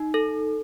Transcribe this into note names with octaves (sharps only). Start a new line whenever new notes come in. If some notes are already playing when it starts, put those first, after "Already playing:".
Already playing: D#4
A4